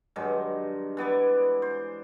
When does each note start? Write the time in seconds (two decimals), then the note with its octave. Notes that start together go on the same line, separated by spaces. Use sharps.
0.16 G2 D#3 F#3 G#3
0.97 E3 B3 D5 G#5
1.62 C5